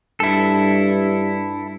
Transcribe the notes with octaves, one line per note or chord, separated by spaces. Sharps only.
G2 E4 A4